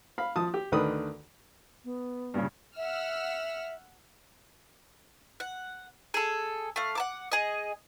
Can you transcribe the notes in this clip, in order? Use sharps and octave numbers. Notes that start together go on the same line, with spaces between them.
F5 B5
F3 A5 D#6
G4
D2 D3 D#3 B4 D#6
B3
G2 A#2 C#3
E5 F#5 E6 F6
F#5
G#4 A4
A3 F5
F#5 A5 D6
G#4 D#5